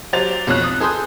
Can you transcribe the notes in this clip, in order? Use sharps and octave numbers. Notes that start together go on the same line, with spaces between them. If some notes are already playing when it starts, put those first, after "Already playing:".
F#3 G4 C5 A6 F7
B1 F2 C#5 F#6
D#6
G#4 A4 B4 C6 D#6 G6